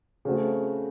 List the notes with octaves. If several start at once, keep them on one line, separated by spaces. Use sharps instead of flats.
C#3 A3 C4 F#4